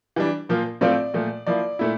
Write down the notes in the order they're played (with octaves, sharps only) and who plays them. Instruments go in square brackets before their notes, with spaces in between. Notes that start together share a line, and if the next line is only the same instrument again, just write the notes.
[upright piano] E3 G3 D4
A#2 F3 A#3 F4
A2 F3 A3 C4 F4 D5
A#2 F3 A3
F3 A#3 E4 D5
A#2 A3 E4